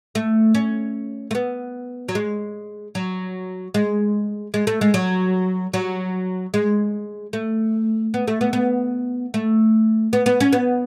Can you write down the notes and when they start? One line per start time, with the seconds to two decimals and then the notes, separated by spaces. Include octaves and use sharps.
0.15 A3
0.54 C#4
1.31 A3
1.35 B3
2.09 F#3
2.15 G#3
2.95 F#3
3.74 G#3
4.54 G#3
4.67 A3
4.81 G#3
4.94 F#3
5.73 F#3
6.54 G#3
7.33 A3
8.14 B3
8.28 A3
8.41 B3
8.53 B3
9.34 A3
10.13 B3
10.26 B3
10.40 C#4
10.53 B3